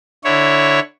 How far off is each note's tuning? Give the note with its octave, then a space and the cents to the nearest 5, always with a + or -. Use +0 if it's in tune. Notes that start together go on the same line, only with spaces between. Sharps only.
D3 +10 E4 +0 C#5 +0